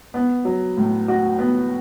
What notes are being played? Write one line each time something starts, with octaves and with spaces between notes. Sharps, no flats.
B3
F#3
A2
F#4
B3